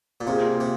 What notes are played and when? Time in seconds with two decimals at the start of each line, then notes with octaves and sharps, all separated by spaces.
0.21 A#2
0.26 C3 A#3 F4 G#4 C5
0.60 C3